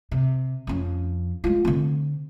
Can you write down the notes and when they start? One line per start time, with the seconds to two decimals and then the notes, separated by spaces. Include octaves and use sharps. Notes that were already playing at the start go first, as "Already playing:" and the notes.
0.11 C3
0.67 F2 C#4
1.44 G#3 F4
1.65 D3 C4